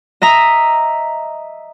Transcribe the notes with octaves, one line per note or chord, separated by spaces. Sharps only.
D#5 E5 A#5